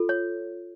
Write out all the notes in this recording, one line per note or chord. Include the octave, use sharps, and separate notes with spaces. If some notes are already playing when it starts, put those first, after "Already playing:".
Already playing: F4 A4
C#5